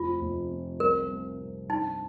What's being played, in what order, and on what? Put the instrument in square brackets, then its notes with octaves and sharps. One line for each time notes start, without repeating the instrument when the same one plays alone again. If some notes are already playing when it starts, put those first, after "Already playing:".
Already playing: [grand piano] F1 [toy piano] F4
[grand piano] F1
C4
[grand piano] C2 [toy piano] A#4
[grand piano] C2
C3
[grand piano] G2 [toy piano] D#4